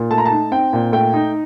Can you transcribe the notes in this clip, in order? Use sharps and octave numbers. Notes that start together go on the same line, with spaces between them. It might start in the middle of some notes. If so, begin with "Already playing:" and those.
Already playing: A#2
A3 A5
A#5
A5
D#4
C4 G5
A#2
A3 G5
D#4